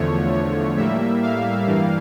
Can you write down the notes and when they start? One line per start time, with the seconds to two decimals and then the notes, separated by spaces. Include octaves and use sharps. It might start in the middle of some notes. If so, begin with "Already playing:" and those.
Already playing: E2 D3 F3 A3 C#5
0.32 C#5
0.77 A2 G3 A#3 E5
1.23 F5
1.67 G2 E3 G3 A#3